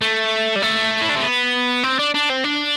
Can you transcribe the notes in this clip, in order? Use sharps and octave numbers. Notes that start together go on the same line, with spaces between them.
A3
G3
A3
E4
D4
C4
B3
C4
D4
D4
C4
D4